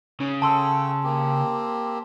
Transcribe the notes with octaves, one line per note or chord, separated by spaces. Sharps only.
C#3
A4 G5 A5 C6 E6
A#3 C4 G4